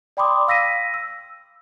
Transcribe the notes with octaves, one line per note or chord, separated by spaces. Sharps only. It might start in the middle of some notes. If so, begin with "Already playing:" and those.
D5 G5 B5 C6 D6 D#6
F5 E6 A#6 B6 D#7
E6